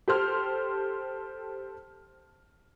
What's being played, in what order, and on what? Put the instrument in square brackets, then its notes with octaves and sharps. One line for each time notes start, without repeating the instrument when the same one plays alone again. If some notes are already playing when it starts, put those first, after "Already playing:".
[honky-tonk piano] G4 A4 C5 C6 F6